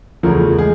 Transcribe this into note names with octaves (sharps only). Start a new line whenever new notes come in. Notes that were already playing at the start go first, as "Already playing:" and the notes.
E2 C#3 F3 A3 A#4
G#3 G#4